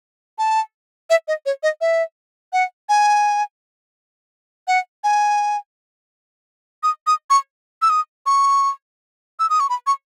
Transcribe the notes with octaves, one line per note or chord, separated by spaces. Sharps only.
A5
E5
D#5
C#5
D#5
E5
F#5
G#5
F#5
G#5
D#6
D#6
C#6
E6
D#6
C#6
E6
D#6
C#6
B5
C#6